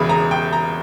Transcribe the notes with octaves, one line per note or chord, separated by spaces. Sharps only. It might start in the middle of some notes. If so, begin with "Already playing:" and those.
Already playing: E1 E2 C#3 B5
A#5
G5
A#5